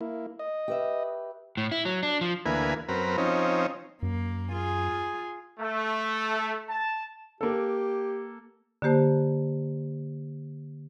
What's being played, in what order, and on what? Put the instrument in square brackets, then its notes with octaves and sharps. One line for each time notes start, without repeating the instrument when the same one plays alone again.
[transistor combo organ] A#3 E4
D#5
[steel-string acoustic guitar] G4 B4 E5
[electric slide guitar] A2
E4
F#3
D4
F3
[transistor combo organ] D2 E3 A#3 B4 G#5
F#2 C4 A#4 B4
F3 C4 C#4 D#4
[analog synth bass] F#2 [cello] A#3
[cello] F4 G#4
[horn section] A3
A5
[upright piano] A#3 A4 [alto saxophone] G4
[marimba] D3 A#3 G4 C5 A5